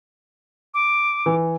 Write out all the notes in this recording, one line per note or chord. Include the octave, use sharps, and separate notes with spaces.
D6
E3